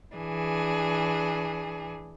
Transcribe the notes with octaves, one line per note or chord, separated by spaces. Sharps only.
E3 D4 G#4